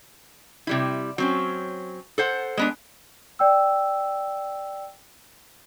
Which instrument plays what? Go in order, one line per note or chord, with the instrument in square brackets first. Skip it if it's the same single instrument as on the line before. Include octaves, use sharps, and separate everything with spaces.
[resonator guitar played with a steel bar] C3 G3 E4
F#3 C4 C#4
A4 C5 F#5
G#3 B3 D4
[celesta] D5 G5 E6